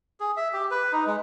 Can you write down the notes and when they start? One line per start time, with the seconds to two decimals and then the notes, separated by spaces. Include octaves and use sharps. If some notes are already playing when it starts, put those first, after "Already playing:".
0.20 G#4
0.37 E5
0.53 G4
0.71 B4
0.92 D#4
1.06 G#3